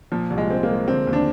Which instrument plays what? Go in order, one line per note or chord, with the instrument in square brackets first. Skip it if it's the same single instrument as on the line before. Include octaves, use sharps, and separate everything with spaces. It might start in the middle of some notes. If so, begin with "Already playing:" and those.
[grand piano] A#2 [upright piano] F3
[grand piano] C2
[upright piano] G#3
[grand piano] C4
[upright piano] A#3
[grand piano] G#3
[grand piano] D3 [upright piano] C4
[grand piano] D#2
[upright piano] D4